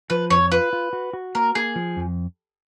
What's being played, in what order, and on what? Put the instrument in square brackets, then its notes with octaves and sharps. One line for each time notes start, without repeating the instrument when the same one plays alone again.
[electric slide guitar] F3 [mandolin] B4
[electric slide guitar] F2 [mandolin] C#5
[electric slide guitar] F4 [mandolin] B4
[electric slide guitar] F4
F#4
F#4
[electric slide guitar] A#3 [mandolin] A#4
[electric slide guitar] A#3 [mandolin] G#4
[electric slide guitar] F3
F2